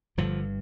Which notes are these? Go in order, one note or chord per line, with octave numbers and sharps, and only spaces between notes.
G1 G2 D3 F3